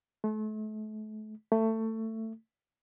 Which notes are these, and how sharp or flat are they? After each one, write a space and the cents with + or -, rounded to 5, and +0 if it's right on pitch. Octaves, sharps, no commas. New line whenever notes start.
A3 -35
A3 +20